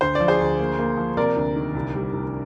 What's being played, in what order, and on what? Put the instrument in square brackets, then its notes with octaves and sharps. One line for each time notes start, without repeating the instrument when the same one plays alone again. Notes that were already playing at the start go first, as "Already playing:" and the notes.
[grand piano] D2 C5
F3 D5
G#4 C5
D2
A#3
A#3
F3
C3 A#4 D5
D2
D#3
C2
G3
C2